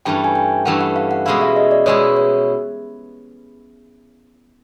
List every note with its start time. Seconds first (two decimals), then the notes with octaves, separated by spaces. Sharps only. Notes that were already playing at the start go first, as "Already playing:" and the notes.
0.05 G2 E3 A3 C#4 G5
0.24 G#5
0.35 G5
0.65 G2 E3 A3 C#4 F#5
0.81 F#5
0.96 F5
1.11 F#5
1.26 B2 G#3 C#4 E4 F5
1.41 E5
1.56 D#5
1.71 D5
1.86 B2 G#3 C#4 E4 C#5
2.16 C#5